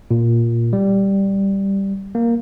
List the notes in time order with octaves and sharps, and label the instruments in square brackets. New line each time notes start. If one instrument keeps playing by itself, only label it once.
[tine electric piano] A#2
G3
A#3